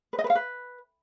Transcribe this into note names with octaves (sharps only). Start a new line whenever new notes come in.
B4
D#5
B4
F5
B4